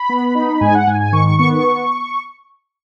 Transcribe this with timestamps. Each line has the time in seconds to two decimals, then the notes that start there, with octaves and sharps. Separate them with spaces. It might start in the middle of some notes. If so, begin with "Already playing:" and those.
Already playing: B5
0.09 B3
0.35 D#4
0.61 G#2 G#5
0.75 F#5
0.87 G#2 G#5
1.00 G#5
1.12 D#3 C#6
1.27 C#6
1.39 B3 C#6
1.52 C#6